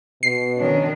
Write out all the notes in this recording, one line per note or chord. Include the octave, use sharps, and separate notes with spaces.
B2 C7
D#3 C#4 D4